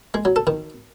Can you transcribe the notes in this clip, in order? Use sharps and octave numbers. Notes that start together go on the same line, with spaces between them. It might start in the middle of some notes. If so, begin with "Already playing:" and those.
G#3
F#3
A4
D#3